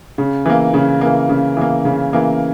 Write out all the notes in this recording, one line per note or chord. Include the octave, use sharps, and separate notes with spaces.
C#3
E3 A#3
C#3
E3 A#3
C#3
E3 A#3
C#3
E3 A#3